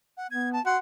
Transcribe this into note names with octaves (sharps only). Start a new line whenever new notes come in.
F#5
B3 G#6
A5
F#4 F#5 C6